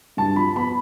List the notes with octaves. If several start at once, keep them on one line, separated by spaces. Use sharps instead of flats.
G2 A5
F3 B5
B3 B5